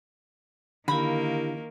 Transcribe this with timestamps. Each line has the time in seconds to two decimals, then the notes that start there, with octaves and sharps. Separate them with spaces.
0.88 D3 D#3 A#3 E4 G4 F5 B5